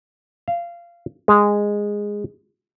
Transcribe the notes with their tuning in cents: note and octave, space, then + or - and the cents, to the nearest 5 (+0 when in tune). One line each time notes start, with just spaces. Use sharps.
F5 -20
G#3 -10